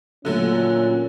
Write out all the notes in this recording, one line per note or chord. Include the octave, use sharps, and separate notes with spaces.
A#2 D3 F#3 A3 C#4